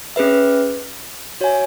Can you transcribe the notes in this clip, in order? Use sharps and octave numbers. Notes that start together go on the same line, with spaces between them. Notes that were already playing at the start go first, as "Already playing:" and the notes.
C#4 G#4 B4 E5
F#4 C#5 E5 G#5